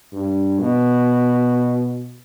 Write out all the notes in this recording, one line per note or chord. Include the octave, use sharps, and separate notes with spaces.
G2
B2